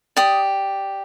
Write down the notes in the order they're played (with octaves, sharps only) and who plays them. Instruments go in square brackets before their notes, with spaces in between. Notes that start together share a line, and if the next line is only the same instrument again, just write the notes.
[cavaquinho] G4 D5 D#6